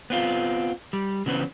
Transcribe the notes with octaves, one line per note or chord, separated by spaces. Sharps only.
B3 C4 F4
G3
C#3 E3 B3 C4